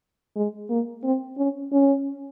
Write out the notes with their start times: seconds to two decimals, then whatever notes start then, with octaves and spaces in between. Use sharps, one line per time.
0.36 G#3
0.70 A#3
1.04 C4
1.38 C#4
1.72 C#4